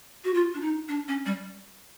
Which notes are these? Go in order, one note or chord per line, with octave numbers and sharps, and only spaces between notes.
F#4
F4
D4
D#4
D4
C#4
G3